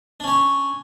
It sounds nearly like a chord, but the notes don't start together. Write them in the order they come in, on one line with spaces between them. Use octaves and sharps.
D4 C#4 C#5